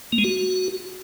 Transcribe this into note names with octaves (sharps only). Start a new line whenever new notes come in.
A#3
G#3
F#4